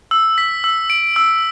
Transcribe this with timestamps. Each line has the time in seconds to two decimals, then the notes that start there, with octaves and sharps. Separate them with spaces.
0.11 E6
0.38 B6
0.64 E6
0.90 D7
1.16 E6